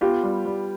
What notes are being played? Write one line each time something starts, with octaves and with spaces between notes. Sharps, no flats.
B3 F4 G4
G3
G3